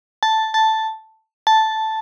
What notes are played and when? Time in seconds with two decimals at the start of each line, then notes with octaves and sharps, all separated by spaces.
0.23 A5
0.54 A5
1.47 A5